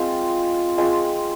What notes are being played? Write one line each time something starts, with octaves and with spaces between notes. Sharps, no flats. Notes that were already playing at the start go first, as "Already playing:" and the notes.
Already playing: G#3 C4 F4
G#3 C4 F4